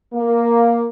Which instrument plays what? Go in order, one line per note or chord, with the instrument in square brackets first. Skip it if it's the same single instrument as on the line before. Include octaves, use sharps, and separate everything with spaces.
[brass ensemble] A#3